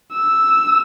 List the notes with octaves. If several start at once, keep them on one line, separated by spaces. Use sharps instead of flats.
E6